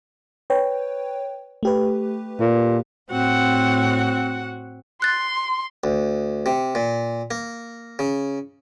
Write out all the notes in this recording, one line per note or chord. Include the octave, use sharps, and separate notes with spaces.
B4 C#5 G5
A3 G4 B4
A#2
A2 C4 F#4 F#5
C6 F#6 A6
D2
C3
A#2
A#3
C#3